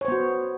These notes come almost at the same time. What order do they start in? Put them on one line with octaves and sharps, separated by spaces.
C#5 C5 B3 F#4